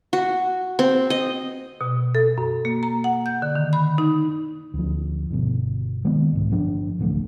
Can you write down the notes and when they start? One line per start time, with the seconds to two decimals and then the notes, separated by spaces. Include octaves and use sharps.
0.13 F#4
0.79 C4
1.10 D#5
1.81 B2
2.15 A4
2.38 F#2
2.65 A#3
2.83 A#5
3.04 F#5
3.26 G6
3.42 D3
3.55 D#3
3.73 B5
3.98 D#4
4.74 D2 F3
5.31 G1 B2
6.05 D#3 G#3 A#3 B3
6.33 C2 G#2
6.50 G1 F3 D4
6.99 A1 D2 G#3 A3